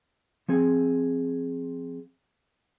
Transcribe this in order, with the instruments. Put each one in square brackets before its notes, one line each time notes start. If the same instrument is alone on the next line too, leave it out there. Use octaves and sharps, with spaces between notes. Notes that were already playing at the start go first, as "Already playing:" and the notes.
[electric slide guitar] F3 C4 G#4